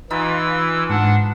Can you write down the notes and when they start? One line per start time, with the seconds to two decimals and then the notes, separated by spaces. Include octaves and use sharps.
0.10 E3 D#4 F4 B4 E6
0.90 G#2 D4 F#5